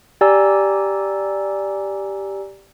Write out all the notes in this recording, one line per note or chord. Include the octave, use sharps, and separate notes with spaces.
G4 D5 G#5 A#5 E6